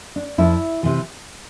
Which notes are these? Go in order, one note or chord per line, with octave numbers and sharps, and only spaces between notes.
D4
F2 E4
C3 E3